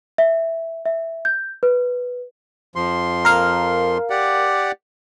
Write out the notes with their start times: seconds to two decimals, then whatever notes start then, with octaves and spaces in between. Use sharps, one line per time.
0.18 E5
0.86 E5
1.25 G6
1.63 B4
2.76 F2 F3 C6
3.25 A#4 F5
4.10 G4 D5 F#5